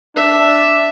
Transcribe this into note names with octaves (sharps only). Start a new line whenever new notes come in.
D4 E5